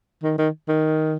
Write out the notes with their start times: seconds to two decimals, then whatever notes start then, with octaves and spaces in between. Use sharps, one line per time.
0.23 D#3
0.38 D#3
0.68 D#3